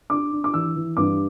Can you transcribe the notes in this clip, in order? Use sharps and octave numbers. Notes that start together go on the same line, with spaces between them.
D4 D6
D4
D6
E3 E6
E3
G2 D6